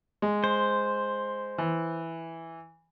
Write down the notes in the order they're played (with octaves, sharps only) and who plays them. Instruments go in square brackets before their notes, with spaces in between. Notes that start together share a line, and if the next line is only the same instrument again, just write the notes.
[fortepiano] G#3
[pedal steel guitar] C5
[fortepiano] E3